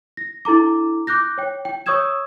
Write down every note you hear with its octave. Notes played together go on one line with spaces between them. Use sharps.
A#6
D4 E4 A4 A#5 D6
D6 F#6 G6 A#6
C#5 G5
G5
C#5 C#6 D#6 E6 G#6 E7